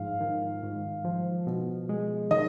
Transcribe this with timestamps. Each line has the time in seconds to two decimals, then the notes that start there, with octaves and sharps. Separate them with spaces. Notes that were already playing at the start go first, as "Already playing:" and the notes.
Already playing: G#2 F3 F5
0.21 D#3
0.63 G#2
1.04 F3
1.47 B2
1.89 G#3
2.31 D#3 D#5